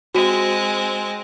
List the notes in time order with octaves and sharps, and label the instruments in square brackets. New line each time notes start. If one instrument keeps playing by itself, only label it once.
[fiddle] G#3 C4 [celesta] F#4 D#7